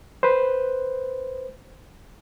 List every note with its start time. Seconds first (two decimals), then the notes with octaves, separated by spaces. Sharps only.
0.23 B4 C5